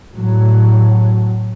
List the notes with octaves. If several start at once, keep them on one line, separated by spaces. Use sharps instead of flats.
A2 F#3